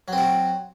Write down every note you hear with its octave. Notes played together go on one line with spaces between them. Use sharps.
F#3 C4 F#4